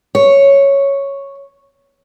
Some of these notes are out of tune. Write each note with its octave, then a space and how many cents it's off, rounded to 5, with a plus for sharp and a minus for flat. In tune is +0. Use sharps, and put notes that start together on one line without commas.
C#5 +0